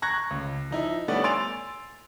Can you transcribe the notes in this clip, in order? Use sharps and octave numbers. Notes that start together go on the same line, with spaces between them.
A#5 C#6 F#6 G#6 A#6
C#2
F3 D#4 E4
G3 A3 B3 C#4 D4
G#5 C6 E6 A6 D7 F7